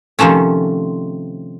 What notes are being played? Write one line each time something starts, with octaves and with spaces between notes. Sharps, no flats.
C3 D#3 F3 A3 C#4